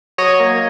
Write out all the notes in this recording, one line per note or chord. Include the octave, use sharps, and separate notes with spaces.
F#3 C#5 D#5
A#3